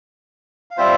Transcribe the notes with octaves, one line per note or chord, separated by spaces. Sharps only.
F5
G3 C4 F4 C5 E5